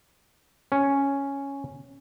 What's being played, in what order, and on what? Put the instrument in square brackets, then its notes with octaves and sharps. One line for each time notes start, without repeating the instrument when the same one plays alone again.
[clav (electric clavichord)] C#4